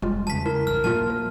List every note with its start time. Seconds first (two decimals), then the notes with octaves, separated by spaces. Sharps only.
0.02 F1 F2 G3 G#3 F4
0.27 E2 C#3 A5 B6
0.46 E4 A#4
0.67 A#1 G2 F6
0.84 A#2 F#3 A3 A#3 F4 A5
1.10 A#4